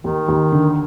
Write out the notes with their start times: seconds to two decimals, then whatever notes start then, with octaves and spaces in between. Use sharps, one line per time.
0.03 D#2 D#3
0.28 D#2
0.52 D3